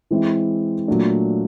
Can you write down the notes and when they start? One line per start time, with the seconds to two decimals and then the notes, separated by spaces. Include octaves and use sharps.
0.11 E3 G#3 C4 E4
0.88 A#2 F#3 A3 D4